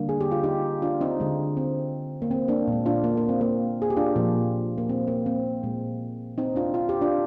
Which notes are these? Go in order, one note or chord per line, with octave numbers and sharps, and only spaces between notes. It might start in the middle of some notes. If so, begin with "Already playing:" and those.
Already playing: D3 G3 A#3
G#4
G4
F4
D#4 G4
D4 F4
C4 D#4
D3 G#3
C4
A#3
C4
A#3 D4
A#2 G#3
D4 F4
A#3
A#3
C4
A#3
G#4
G4
D4 F4
A#2 F3 A#3
A#3
C4
A#3
C4
A#2 G#3
C4 D#4
D4 F4
F4
G4
D4 F4